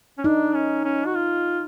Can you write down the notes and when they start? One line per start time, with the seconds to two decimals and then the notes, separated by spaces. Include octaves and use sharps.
0.18 C#4
0.24 D4 D#4
0.54 C#4
0.84 C#4
1.06 F#4
1.15 F4